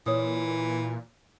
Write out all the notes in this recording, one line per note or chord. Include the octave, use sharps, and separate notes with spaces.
A#2 E3 C#5 D#6